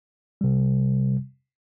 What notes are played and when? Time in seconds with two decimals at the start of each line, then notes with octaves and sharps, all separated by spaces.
0.41 C3 G3